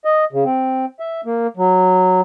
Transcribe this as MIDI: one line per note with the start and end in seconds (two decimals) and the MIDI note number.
0.05 0.25 75
0.32 0.44 49
0.45 0.85 60
1.00 1.21 76
1.25 1.47 58
1.57 2.21 54